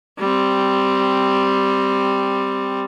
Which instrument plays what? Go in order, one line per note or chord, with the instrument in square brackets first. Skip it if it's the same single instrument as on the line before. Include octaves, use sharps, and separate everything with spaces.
[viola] G3 C4